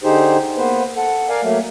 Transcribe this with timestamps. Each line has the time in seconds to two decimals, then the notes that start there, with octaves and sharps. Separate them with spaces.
0.04 D3 D#4 G4 G#4 C5
0.57 A#3 B3 B4 C5
0.96 A4 F#5
1.29 A#4 D5 F5 G#5
1.42 F#3 A3 A#3